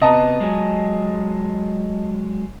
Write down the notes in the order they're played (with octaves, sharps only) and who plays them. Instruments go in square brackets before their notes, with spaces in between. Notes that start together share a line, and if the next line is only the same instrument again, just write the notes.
[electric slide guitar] C3 B3 [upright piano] D#5 A5 A#5
[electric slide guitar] F#3 G#3